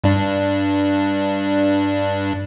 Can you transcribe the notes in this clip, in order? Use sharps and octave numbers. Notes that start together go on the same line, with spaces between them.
G2 D4